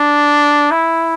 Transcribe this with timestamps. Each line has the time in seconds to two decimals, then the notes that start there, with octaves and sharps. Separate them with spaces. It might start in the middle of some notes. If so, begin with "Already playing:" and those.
Already playing: D4
0.71 E4